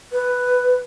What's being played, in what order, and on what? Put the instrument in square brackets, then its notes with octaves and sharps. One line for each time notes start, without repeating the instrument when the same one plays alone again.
[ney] B4